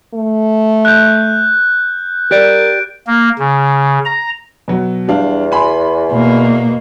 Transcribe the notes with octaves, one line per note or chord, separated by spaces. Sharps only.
A3
F#6 G6
G4 A#4 D5 F#6 G6 D7
A#3
C#3
A#5
B2 F#3 F#4
E2 G3 D4 F5
G#5 B5 C6
B2 A#3